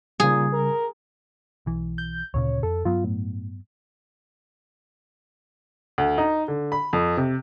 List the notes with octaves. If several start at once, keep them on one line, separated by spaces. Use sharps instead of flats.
A#2 C#3 G3 G#4
A#4
B1 E3
G6
D2 A#2 C#3 C#5
F2 A4
G2 F#3 B3 F4
A2
D2
D#4
D3
B5
F2
C3